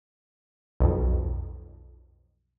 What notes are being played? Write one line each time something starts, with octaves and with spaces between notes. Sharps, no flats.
B1 F2